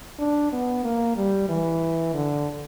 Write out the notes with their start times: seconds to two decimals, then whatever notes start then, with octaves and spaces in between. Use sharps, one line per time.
0.19 D4
0.52 B3
0.84 A#3
1.16 G3
1.49 E3
2.14 D3